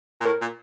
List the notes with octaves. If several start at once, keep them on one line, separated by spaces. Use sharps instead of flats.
A#2
A2 A#4
A#2